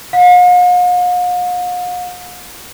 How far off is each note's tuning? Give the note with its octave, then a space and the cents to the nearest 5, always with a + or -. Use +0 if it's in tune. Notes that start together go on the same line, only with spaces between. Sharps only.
F5 +45